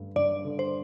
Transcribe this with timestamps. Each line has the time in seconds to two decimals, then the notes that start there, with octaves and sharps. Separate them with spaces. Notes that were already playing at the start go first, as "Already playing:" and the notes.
Already playing: G2 D3 A3
0.16 G2 D5
0.45 D3
0.59 C5